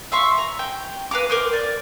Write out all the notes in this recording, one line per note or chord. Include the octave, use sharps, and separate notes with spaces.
E5 F5 C6 C#6
A#5
G5
B4 F5 A#5 D6
A#4 C5 D6
D5